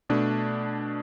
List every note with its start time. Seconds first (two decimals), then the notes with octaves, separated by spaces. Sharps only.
0.10 B2 A3 D4